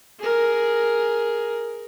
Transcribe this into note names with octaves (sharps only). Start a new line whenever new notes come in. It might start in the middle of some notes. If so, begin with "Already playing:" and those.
G#4 A#4